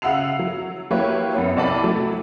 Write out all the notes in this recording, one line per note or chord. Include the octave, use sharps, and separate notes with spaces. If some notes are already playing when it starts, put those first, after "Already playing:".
C#3 E5 F#5 E6 C7 F7
F#3
F#3 A#3 E4 G4 B4 C#5
F#2 B3 C#4
C2 C3 D5 A5 B5
F#3 A3